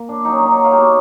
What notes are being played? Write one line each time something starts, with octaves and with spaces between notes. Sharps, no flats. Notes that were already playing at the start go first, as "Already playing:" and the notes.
Already playing: A#3
A#2 D4
F#3 D#4
C#4
F#3 D4
D#4
F#3
F4
B2 F#4 G4